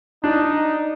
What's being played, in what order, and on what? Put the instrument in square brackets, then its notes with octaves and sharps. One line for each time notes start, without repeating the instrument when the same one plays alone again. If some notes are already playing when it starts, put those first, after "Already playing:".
[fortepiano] D4 [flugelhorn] D#4